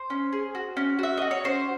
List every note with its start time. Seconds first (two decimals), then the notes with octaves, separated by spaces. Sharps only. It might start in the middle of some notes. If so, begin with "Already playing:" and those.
Already playing: C5
0.10 C#4
0.33 G#4
0.55 F#4
0.77 C#4
0.99 F#4 E5
1.17 F#4 D#5
1.31 C#5
1.44 C#4 C5